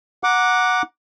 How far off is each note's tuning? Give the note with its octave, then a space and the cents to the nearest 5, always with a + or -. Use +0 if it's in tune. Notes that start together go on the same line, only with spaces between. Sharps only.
F#5 -10 A#5 +10 D6 +0